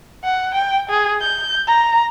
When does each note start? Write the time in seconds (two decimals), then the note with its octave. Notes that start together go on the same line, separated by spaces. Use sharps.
0.24 F#5
0.54 G5
0.90 G#4
1.21 G6
1.67 A#5